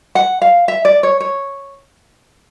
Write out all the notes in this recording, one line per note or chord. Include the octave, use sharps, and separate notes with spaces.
F#5
F5
E5
D5
C#5
C#5